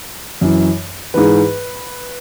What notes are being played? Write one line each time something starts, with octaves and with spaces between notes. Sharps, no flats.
F#2 E3
G#2 E3 B4